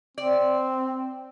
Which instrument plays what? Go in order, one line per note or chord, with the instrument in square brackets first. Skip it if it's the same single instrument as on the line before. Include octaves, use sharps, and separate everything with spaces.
[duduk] C4 [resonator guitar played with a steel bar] D5